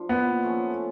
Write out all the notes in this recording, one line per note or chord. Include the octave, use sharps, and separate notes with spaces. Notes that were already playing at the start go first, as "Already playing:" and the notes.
Already playing: F3 D4
A#2 B3
F3 A3 C#4